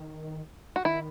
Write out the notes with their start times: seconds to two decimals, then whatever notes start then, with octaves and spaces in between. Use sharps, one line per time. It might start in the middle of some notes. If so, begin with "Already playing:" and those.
Already playing: D#3
0.76 F#4
0.85 D#3 E4